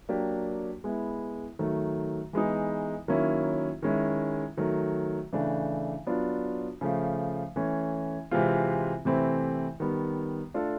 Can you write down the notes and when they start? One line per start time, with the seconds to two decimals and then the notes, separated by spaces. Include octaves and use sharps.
0.09 F#3 A#3 D4 G4
0.84 G#3 B3 E4
1.59 D#3 F#3 A3
2.33 E3 G#3 B3 D#4
3.08 D#3 F#3 A#3 C#4 E4
3.82 D#3 G#3 C#4 E4
4.57 D#3 F#3 A3
5.33 C#3 E3 A3 D4
6.07 F#3 B3 D4 F4
6.81 C#3 F3 A3
7.56 E3 A3 C#4
8.31 C3 E3 G#3 C4 F4
9.05 C3 E3 A3 C4 E4
9.80 D#3 G3 B3
10.54 A3 D4 F4 A4